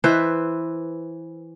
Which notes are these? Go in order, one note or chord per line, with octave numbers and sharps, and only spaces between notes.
E3 B4 C5 E5